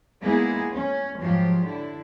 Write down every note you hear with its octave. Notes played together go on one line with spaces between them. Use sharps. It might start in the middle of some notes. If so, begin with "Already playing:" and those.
G#3 A#3 B3 D#4 E4 G#4
C#4
G#2 F3 F#3 F4 G4
D3 E4